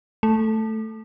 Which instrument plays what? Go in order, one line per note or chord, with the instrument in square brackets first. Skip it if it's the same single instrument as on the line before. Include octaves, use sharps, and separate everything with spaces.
[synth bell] A3